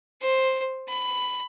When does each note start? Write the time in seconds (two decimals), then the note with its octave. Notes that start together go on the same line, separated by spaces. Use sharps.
0.22 C5
0.88 B5